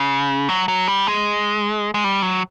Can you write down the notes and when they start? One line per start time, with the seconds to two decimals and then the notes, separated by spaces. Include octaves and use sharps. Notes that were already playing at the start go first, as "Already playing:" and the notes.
Already playing: C#3
0.49 F#3
0.68 F#3
0.88 G3
1.07 G#3
1.94 G#3
2.04 G3
2.22 F#3